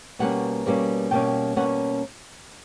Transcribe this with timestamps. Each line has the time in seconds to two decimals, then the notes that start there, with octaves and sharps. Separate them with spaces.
0.19 B2 G3 A#3 C#4 F#5
0.66 B2 G3 A#3 C#4
1.11 B2 G3 A#3 C#4 G5
1.56 B2 G3 A#3 C#4 F#5